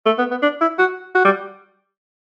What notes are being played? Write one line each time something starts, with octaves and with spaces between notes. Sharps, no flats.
A3
B3
B3
D4
E4
F#4
F#4
G3